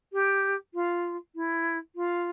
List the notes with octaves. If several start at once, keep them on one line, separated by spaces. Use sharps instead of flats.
G4
F4
E4
F4